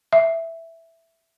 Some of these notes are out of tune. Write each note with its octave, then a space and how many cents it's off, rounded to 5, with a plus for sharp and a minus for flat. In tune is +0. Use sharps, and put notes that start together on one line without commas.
E5 +0